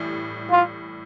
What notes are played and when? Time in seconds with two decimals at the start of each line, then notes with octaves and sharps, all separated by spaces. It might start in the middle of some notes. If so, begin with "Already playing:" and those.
Already playing: A2 E3 G3
0.49 F4